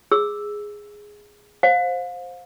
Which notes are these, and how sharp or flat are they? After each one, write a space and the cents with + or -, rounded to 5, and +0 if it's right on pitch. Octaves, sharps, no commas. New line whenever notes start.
G#4 +0 E6 +0
C5 +0 F5 +30